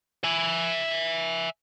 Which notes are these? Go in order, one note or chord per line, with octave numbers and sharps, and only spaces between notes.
E5 G#5